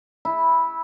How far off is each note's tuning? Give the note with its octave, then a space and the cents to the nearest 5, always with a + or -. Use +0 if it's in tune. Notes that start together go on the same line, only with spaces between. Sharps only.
E4 -10